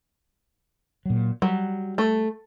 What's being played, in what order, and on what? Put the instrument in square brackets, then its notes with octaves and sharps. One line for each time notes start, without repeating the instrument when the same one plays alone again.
[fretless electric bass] A#2 F#3
[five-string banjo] F#3 [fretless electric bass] G3
[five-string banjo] A3